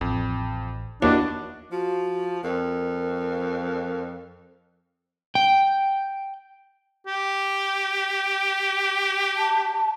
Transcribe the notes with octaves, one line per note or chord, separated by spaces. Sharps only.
A1 F2
D#2 D4 E4 F#4 D#5
F3 F#4
F2 A#4
G5
G4
A5